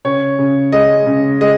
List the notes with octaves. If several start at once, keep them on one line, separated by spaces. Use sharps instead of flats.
C#3 C#5
C#3
G#3 D#5
C#3
G#3 D#5